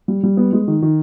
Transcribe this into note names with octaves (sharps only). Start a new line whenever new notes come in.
G3
G3
B3
G#3
D#3
D#3